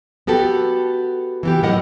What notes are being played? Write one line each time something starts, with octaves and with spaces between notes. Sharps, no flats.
B3 F#4 G4 A4
E3 B3 G4
A2 F#3 A#4 D#5 F#5